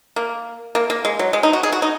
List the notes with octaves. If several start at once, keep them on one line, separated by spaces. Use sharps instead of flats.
A#3
A#3
A#3
G#3
F#3
G#3
D#4
F#4
G#4
F#4
D#4